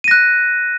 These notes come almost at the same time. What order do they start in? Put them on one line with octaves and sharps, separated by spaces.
D#7 A#6 F#6